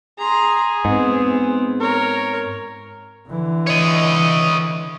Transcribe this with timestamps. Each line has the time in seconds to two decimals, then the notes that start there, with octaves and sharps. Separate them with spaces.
0.19 G#4 A#5 C6
0.85 G#2 B3 C4
1.81 A#4 C#5
3.27 D3 E3
3.67 C#5 D#5